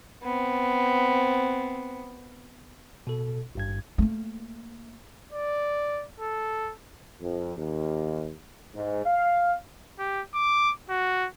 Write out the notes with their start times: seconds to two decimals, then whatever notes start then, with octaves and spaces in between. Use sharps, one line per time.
0.23 B3 C4
3.07 B2 A4
3.55 G#1 G2 G#6
3.98 A3 A#3
5.33 D5
6.20 A4
7.21 F2
7.56 D#2
8.75 G#2
9.06 F5
9.99 G4
10.34 D6
10.89 F#4